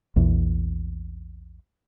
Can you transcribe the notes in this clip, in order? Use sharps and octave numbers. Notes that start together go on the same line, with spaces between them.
A#1 E2